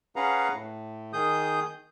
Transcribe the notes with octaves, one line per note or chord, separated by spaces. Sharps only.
C#4 G#4 B4 F5 F#5 A#5
A2
D#3 G#4 D#6 G6